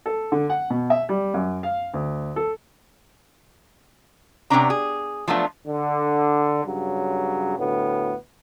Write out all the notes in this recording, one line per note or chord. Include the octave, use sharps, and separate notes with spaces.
A4
D3
F#5
B2
E5
G3
F#2
F5
D2
A4
C3 A3 B3 C#4 D4 A#5
G#4
F3 F#3 A3 B3 D4 F4
D3
G2 C#3 F#3
D2 A2 B3